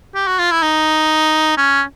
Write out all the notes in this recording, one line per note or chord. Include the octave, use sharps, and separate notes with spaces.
G4
F#4
F4
E4
D#4
C#4